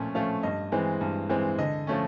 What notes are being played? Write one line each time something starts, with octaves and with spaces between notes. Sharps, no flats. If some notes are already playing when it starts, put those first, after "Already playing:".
Already playing: A#2 F3 A3 C#4
F3 A3 C#4 F5
G2 D#5
E3 G#3 C4
G2
E3 G#3 C4
D3 D#5
F3 A3 C#4